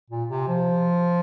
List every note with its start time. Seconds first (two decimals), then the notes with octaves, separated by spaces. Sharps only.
0.10 A#2
0.30 C3
0.48 F3